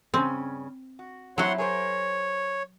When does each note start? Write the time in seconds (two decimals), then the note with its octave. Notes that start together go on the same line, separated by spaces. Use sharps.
0.14 G2 C#3 C4 C#4
0.99 F#4
1.38 F#3 C4 E4 F#4 G4 C#5 F#5 C6
1.58 G#4 A#4 C5 C#5